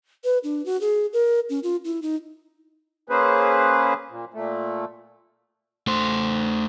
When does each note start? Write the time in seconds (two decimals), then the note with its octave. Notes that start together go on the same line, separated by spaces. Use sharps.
0.24 B4
0.44 D4
0.66 F#4
0.81 G#4
1.13 A#4
1.50 C#4
1.63 F4
1.85 E4
2.02 D#4
3.10 A#3 C#4 G#4 B4 C5
4.10 A#2
4.34 A#2 A3
5.87 A3 C5